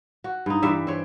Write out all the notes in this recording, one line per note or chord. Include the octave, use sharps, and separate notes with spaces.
F#4
G2 D#4
G2 E3 G4 E5
C4 C#5